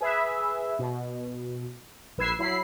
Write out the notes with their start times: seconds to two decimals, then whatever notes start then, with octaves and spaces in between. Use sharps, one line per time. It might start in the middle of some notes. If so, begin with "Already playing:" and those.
0.01 G#4 B4 E5
0.79 B2
2.18 A#1 B4 E6 G#6 C7
2.39 F#3 E4 B5 C7